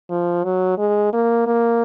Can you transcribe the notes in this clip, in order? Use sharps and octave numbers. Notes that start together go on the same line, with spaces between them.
F3
F#3
G#3
A#3
A#3